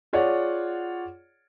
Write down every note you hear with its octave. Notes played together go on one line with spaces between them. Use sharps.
F4 G#4 C#5 D5 F#5